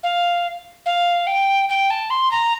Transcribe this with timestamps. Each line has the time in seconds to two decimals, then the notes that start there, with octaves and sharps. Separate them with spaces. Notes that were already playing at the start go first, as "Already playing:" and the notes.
0.03 F5
0.86 F5
1.27 G5
1.69 G5
1.90 A5
2.10 C6
2.31 A#5